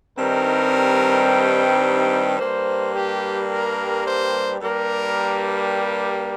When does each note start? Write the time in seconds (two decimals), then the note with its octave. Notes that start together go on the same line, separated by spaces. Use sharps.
0.17 G2 D#3 G3 C4 D#4 A#4
2.38 G2 G3 A#3 C5
2.93 G4
3.49 A#4
4.05 C5
4.60 G2 G3 A#3 A#4
5.71 G4